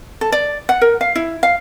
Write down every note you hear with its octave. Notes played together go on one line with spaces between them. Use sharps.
A4
D5
F#5
A#4
F5
E4
F5